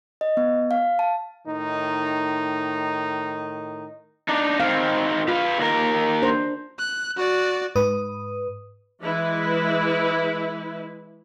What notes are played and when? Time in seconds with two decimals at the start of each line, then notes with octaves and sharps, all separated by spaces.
0.21 D#5
0.37 B3
0.71 F5
0.99 A5
1.47 A2 D#3 D#4
4.29 D4 D#4
4.60 D#3 C4 F5
5.28 F4 B4 F5
5.58 D#2 A#4
6.22 D4 C5
6.79 F#6
7.17 F#4 D5
7.76 G#2 B4 D#6
9.02 E3 G#3 E4 B4